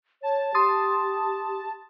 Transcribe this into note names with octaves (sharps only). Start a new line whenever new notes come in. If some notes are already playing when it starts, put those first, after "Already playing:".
C#5 A5
G4 C6 D#6 A6